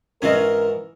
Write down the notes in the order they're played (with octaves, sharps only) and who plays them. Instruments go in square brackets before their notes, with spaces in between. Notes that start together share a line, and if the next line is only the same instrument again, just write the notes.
[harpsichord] G#2 E3 [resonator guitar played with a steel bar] C#4 F4 D#5 [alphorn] A#4